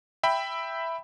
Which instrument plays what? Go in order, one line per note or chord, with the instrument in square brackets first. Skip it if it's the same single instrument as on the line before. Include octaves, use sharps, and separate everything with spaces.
[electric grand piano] E5 G5 B5